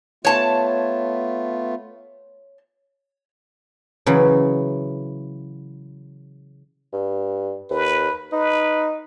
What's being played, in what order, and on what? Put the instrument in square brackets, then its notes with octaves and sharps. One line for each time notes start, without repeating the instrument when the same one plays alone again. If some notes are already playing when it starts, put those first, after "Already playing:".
[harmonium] A3 B3 F4 [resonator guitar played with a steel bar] C#5 A5
[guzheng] C#3 E3 F#3
[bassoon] G2
[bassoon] D#2 [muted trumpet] B4
[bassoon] D#4 [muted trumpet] B4